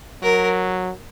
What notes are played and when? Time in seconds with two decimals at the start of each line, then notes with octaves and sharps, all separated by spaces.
0.23 F#3 A#4